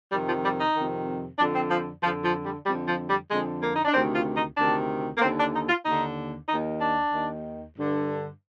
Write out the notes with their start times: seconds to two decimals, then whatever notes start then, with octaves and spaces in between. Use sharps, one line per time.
0.12 F2 C3 D#3 G3
0.28 F3
0.44 G3
0.60 D#4
0.76 F2 C3 D#3
1.39 F2 D3 D4
1.55 C4
1.71 F3
2.03 F2 D3 F3
2.25 F3
2.46 G3
2.66 F2 D3 G3
2.88 F3
3.09 G3
3.30 F2 D3 G#3
3.63 A#3
3.76 D#4
3.85 D4
3.94 D2 C3 D#3 C4
4.15 F4
4.37 D#4
4.57 D2 C3 D#3 D4
5.18 A#3
5.22 D#2 D3 C4
5.38 D4
5.54 D#4
5.69 F4
5.85 D#2 D3 D#4
6.49 D#2 D#3 D#4
6.81 D4
7.13 D#2 D#3
7.77 G2 D3